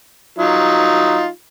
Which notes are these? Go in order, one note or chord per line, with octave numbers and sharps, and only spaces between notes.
F#3 D#4 F4